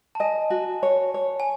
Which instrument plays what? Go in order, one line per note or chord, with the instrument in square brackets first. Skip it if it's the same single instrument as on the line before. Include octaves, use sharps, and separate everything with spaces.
[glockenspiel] A5
[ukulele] D#5 [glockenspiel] G#5
[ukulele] F#4
C#5
C#5
[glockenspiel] G#5